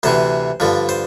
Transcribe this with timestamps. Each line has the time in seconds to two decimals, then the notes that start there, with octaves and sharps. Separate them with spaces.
0.03 D2 C3 E3 C5
0.60 G2 D3 F3
0.89 C5